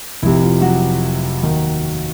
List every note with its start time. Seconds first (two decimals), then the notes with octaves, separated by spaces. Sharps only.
0.22 F1 F2 C3 E4
0.43 F4
0.62 F#3 F#4
1.43 D#2 D#3